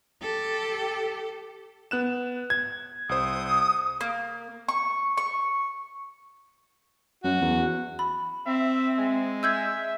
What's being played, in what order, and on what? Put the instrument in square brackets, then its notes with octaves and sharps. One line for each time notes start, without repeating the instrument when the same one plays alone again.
[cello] G4 A4
[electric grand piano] B3 F#6 E7
G#6
[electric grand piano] C2 C5 [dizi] D#6
[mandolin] A#3
C#6
C#6
[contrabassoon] F#2 [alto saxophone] F#4
[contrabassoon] E2
[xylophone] B5
[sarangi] C4 [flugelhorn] E5
[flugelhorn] G#3
[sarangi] E5 [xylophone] E6 G6 G#6